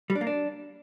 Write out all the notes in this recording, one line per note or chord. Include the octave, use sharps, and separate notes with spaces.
G3
D4
A#3
D4